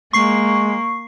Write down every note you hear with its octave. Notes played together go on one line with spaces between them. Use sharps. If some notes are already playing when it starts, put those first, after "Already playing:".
G#3 A#3 C#6 C7